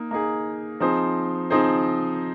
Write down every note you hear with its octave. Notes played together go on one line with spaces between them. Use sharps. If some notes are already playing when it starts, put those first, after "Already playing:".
Already playing: A#3 D#4
A#3 D#4 G#4
F3 C4 D#4 G#4 C5
F3 C4 D#4 G#4 C5